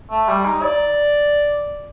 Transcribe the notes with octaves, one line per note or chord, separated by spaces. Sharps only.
A3
G3
D#4
D5